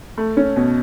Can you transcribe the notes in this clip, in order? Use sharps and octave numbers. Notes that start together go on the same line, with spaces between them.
A3
C#4
B2